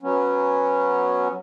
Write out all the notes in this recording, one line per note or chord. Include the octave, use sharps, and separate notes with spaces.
F#3 B3 C#4